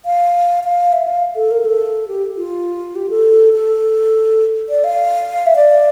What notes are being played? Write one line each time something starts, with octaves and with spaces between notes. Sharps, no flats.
F5
F5
E5
F5
A4
A#4
A4
G4
F4
G4
A4
A4
D5
F5
E5
D5